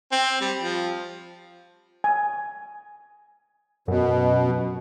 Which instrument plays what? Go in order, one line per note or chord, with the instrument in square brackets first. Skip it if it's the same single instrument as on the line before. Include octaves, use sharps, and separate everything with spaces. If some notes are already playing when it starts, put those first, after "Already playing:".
[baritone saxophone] C4
G3
F3
[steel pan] G#5
[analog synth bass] F#2 [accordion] B2